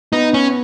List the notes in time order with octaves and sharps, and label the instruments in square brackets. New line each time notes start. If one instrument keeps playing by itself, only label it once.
[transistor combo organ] B3 [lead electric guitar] D#4
[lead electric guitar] C#4